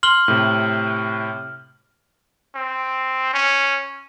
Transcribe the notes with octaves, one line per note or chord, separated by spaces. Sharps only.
C6 F6 F#7 G7
A2 C3
C4
C#4